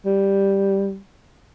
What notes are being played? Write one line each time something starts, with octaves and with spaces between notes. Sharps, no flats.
G3